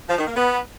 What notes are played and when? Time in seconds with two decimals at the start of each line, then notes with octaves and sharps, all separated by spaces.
0.09 F3
0.18 D#3
0.27 A#3
0.36 B3